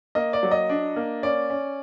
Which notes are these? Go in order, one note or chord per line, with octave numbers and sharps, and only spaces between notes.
A#3 D#5
D5
F#3
D#5
D4
A#3
C#4 D5
C#4